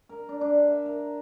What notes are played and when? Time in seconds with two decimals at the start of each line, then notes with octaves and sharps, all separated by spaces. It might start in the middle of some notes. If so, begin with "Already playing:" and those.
0.09 A#4
0.29 D4
0.41 D4
0.68 E5
0.86 A#4